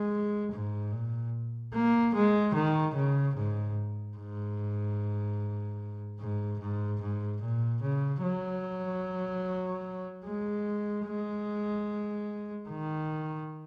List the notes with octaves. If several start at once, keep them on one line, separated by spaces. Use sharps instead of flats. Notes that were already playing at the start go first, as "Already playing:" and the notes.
Already playing: G#3
G#2
A#2
A#3
G#3
D#3
C#3
G#2
G#2
G#2
G#2
G#2
A#2
C#3
F#3
G#3
G#3
D#3